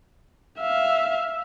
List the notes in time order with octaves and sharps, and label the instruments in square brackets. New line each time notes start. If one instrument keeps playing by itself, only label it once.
[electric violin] E5 F5